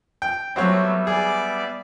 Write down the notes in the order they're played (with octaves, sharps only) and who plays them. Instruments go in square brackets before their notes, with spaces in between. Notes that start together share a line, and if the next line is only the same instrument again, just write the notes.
[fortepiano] G5
[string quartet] F#3 A3 [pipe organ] G3 B3 E5 [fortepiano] C4 F#4 C#5
[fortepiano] G#4 [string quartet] D5